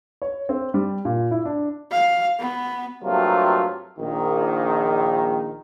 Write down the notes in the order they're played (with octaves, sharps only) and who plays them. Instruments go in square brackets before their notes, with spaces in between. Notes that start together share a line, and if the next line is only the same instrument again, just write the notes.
[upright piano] C#5
C4
G3
A#2
E4
D4
[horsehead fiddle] F5
B3
[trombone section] G2 C3 F#3 A3 A#3 F4
A#1 D#3